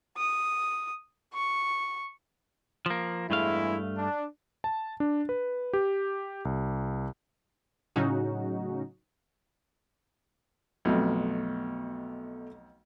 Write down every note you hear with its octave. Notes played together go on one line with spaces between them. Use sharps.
D#6
C#6
F3 A#3
E2 G2 G#3 A3 E4 F5
D4
A5
D4
B4
G4
C2
A2 C#3 F#3 C#4 D#4 F#4
B1 F2 B2 A3 F#4